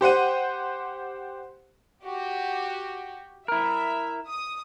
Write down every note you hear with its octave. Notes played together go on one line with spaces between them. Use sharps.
G4 C5 F#5 D#7
F#4 G4
E4 A#4 E5
D#6